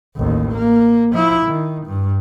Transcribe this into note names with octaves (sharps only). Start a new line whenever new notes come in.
A1 D#2
A#3
F3 E4
D#3
G2